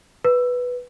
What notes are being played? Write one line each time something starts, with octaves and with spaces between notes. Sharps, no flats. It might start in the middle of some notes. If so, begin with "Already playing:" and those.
B4